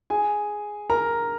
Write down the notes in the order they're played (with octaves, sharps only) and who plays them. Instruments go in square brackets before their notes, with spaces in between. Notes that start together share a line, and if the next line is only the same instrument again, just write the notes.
[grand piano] G#4 G#5
A#4 A#5